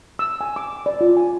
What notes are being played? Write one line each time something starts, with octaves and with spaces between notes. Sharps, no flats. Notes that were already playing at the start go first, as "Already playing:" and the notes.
E6
G#5
D6
D5
F4
G#5